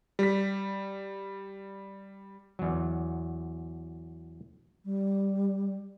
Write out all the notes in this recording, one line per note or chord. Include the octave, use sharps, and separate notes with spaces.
G3 B6
E2 F#3
G3